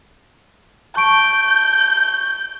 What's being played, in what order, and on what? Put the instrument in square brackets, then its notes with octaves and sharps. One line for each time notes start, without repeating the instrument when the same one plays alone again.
[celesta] A5 C#6 D7 [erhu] G6